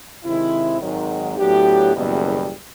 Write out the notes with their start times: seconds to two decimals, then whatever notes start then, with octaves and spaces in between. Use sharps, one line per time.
0.24 C3 D#3 G#3 C4 E4
0.81 G#1 G#2 D#3 F#3
1.38 A2 F#3 B3 D4 G4
1.95 F#1 E2 B2 G3